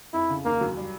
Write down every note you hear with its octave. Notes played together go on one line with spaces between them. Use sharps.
F2 E4
C#3
D#2 A#3
F#3
G3